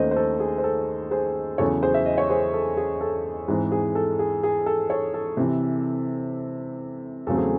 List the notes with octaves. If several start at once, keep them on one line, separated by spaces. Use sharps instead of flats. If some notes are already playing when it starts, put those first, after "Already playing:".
Already playing: D#2 D#3 A3 C#4 C5 D#5
C5
A4
G#4
C5
A4
G#4 C5
E2 C#3 F#3 A4 C#5
G#4 C5
E5
D#5
C#5
G#4 C5
A4
G#4
A4
G#2 E3 C4 G#4
G#4
A4
G#4
G#4
A4
A4 C#5
A4
C3 E3 C4
E2 C#3 F#3 A3 C4 A4
G#4